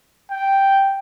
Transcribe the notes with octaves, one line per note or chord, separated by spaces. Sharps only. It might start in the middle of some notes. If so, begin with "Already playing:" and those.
G5